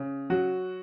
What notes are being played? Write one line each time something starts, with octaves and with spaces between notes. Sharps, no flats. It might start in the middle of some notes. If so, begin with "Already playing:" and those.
Already playing: C#3
F#3 F#4